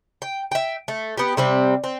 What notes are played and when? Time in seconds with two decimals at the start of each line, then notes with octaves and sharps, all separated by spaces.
0.22 G5
0.52 E5 G5
0.88 A3
1.17 B3 G4
1.37 C3 G3 C4
1.84 C4